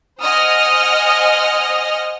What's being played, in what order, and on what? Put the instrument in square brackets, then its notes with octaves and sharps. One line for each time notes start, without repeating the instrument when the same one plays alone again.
[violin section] C5 D#5 F#5 G#5 D#6 F6